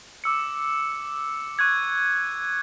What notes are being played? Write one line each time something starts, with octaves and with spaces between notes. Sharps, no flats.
D6 E6 C#7
C#6 F#6 G#6